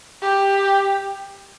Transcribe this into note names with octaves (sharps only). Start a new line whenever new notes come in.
G4